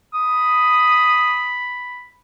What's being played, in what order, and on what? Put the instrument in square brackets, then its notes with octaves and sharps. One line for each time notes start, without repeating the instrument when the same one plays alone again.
[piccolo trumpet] B5 [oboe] D#6